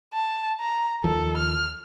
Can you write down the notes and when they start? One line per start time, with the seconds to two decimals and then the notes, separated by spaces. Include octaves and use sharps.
0.13 A5
0.60 A#5
1.04 D#2 F3 A4
1.37 F6